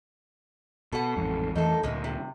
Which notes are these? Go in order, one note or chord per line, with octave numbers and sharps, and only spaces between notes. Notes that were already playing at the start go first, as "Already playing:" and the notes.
B2 A4 F#5
A1 F2 G#2
F2 E3 A3 D#4 A4
D2 A#2 F3 G#3
C3